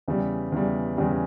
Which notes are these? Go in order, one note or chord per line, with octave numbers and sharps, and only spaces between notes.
E2 C#3 G3
E2 C#3 G3
E2 C#3 G3